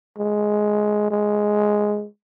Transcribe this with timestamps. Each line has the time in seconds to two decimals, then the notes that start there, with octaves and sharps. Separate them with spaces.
0.18 G#3
1.11 G#3